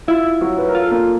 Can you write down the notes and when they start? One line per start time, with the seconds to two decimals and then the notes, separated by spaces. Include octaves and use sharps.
0.08 E4 F4
0.41 F#3 F#4
0.58 B4
0.68 A#4
0.75 F4
0.80 A4
0.90 A#3 A#4